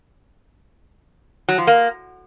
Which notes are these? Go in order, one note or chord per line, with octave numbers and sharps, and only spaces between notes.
F#3
F3
A#3